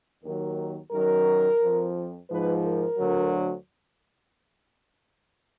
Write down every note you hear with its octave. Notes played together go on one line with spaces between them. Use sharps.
D#2 D#3 F#3 A#4
F#2 D#3 F#3 A#4
F2 F3
G#2 F3 B4
A#4
D2 D3 F#3